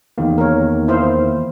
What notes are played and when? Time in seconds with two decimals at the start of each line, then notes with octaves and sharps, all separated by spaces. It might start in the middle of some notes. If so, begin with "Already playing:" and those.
0.18 E2 D#3 A#3
0.38 A#4 C#5
0.88 E4 C5 F5